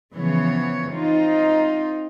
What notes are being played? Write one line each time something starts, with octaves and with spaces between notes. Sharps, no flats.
C#3 E3 F3 B3 C#5
C4 D#4 F4